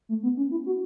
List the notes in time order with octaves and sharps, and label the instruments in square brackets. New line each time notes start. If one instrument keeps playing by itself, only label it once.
[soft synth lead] A3
B3
C#4
E4
F#4